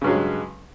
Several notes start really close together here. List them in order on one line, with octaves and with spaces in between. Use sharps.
C#3 G2 F#3 G#3